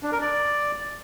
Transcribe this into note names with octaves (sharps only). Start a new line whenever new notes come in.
D4
A#4
D5